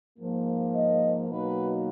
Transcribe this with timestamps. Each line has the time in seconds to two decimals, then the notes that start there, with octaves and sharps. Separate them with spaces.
0.18 G#2 F3 A#3
0.73 D#5
1.28 B2 F#3 A#3 D#4 B4